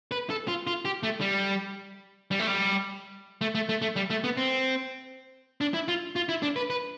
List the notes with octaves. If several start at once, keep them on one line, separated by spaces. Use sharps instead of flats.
B4
A4
F4
F4
G4
A3
G3
G3
A3
G3
A3
A3
A3
A3
G3
A3
B3
C4
D4
E4
F4
F4
E4
D4
B4
B4